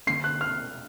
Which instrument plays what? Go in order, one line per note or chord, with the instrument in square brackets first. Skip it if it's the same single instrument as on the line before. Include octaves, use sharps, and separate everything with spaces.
[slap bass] D3 F#3 A#3 C#4 [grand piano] C7
[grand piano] F#6
F6